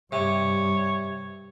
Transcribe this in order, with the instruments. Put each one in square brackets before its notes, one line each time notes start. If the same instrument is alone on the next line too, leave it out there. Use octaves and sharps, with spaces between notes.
[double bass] G2 [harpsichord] C3 [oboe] C#5